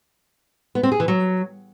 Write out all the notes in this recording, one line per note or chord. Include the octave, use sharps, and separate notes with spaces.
B3
C4
G#4
E3
F#3